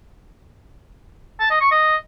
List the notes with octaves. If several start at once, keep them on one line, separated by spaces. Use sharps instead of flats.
A5
D#5
C#6
D#5